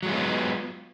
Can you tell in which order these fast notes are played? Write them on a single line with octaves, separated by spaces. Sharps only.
F#3 G#3 F4 B3